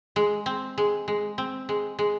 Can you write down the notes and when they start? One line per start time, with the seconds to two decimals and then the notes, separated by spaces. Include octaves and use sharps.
0.16 G#3
0.46 C4
0.78 G#3
1.08 G#3
1.38 C4
1.69 G#3
1.99 G#3